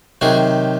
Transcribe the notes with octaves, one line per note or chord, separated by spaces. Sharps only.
C3 D#3 F#3 F#4 G#4